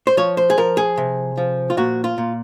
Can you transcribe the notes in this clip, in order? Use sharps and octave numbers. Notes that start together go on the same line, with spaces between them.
C5
F3 C#5
C5
G#4
F3 A#4
G#4
C3
F3
F4
A#2 F#4
F4
A#2